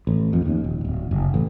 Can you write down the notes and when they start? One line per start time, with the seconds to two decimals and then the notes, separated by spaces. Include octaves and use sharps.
0.07 A1
0.33 F2
0.45 D#2
0.64 D#1
0.84 D1
1.11 F#1
1.34 A1